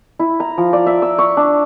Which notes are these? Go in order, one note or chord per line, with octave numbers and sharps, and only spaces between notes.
E4
A#5
F3
D5
E5
E6
C#6
D4